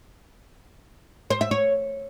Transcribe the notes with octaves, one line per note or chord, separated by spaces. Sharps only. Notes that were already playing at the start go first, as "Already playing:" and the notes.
C5
E5
C#5